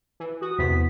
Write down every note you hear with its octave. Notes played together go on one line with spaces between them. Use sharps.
E3
F#4 D#6
E2 C3 B3 B6